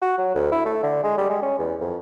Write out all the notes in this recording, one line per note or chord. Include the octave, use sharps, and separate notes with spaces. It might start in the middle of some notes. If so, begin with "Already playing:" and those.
F#4
F#3
D2
E4
A3
D3
G#3
G3
G#3
C#4
E2
F2